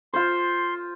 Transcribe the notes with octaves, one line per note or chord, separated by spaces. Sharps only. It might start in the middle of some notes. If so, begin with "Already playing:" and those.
F4 C5 C6